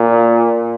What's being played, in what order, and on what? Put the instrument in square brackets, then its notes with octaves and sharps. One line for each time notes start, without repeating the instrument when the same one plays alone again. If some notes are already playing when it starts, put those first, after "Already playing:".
Already playing: [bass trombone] A#2